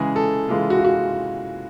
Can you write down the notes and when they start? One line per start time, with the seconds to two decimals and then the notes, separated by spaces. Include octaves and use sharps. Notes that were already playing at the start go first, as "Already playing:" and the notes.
Already playing: C#3 E3 G#3 G#4
0.16 A4
0.49 C#3 E3 G#3 F4
0.70 F#4
0.78 F4
0.85 F#4